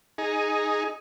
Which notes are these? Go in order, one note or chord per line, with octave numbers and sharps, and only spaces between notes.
D#4 G#4